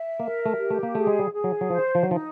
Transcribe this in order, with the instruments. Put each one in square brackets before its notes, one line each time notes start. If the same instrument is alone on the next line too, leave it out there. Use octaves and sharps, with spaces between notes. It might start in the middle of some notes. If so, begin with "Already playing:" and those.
Already playing: [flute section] E5
[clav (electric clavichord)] A#3 [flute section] A#4
[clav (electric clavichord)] A3
[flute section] G4
[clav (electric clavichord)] A3
A#3
[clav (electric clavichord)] A3 [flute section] G#4
[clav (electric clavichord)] G#3
G3
[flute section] G#4
[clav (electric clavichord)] F#3
F#3
[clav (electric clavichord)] F3 [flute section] C5
[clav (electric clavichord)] F3
F#3
[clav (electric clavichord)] F3 [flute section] D#4